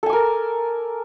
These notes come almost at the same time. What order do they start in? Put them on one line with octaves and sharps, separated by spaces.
A4 G#5 D6 A#4